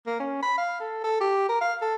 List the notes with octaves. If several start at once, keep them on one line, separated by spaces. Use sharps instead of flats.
A#3
C#4
B5
F5
A4
A4
G4
A#4
F5
A4